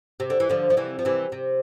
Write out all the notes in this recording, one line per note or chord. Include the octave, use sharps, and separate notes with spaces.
C3
D3
E3
D3 F3
F3
C3 E3
F3
C3 E3
C3